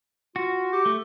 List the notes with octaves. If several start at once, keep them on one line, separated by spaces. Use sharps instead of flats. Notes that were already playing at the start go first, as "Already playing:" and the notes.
F4 F#4
G4
A3